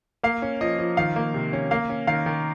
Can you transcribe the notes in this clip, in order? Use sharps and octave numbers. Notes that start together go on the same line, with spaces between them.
A#3 F5
C#4
F3 D#5
F3
D#3 F5
A#3
C3
C#4
A#3 F5
C#4
D#3 F5
D#3